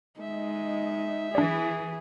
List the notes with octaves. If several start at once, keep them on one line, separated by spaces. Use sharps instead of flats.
G#3 D#4 E5
E3 D4 G#4 D5